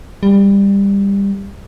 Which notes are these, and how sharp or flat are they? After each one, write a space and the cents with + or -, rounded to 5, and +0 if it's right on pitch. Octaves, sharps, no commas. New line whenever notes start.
G3 +20